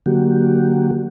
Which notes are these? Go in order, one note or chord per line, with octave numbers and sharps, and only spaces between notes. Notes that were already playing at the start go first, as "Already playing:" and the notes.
D3 F#3 A#3 F#4 G4